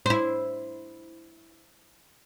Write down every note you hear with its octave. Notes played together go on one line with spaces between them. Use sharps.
E4 C5